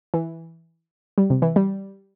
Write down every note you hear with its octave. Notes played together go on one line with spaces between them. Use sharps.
E3
G3
C3
E3
G3